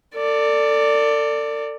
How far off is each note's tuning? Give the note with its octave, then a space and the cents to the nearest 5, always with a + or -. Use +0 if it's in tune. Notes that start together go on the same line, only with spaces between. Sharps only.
A4 +40 D5 +0